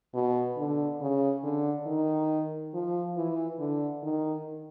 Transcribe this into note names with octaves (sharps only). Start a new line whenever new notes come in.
B2
D3
C#3
D3
D#3
F3
E3
D3
D#3